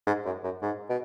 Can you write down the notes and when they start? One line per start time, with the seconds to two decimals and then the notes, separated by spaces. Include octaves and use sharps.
0.07 G#2
0.25 F#2
0.44 F#2
0.62 G#2
0.90 B2